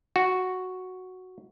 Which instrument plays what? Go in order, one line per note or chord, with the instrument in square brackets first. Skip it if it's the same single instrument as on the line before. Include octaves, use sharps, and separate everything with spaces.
[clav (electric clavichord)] F#4